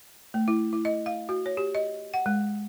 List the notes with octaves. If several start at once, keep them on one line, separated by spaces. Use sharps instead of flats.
A3
E4
E4
D#5
F5
F#4
C#5
G4
D#5
F#5
G#3